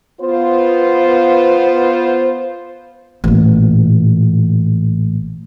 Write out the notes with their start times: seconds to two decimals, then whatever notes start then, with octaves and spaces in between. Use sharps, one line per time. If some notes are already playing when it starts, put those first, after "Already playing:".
0.21 B3 F4 C5
3.24 A1 A#2